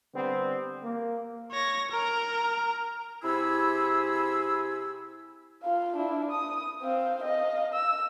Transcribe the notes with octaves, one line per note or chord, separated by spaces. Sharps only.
D3 G3 B3 C4
A#3
C#5 A#6
A#4 A#5
C3 E4 G4 G#4 B5 E6
F4 F5
D4 E4
D#6
C4 F5
D#5 F5
E6